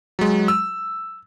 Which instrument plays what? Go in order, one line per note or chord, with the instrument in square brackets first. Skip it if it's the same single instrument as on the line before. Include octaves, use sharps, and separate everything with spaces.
[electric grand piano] F#3 G#3
E6